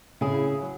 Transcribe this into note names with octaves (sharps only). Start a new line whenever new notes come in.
C#3 E4 G#4
F#3